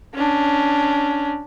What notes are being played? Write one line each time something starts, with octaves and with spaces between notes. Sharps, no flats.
C#4 D4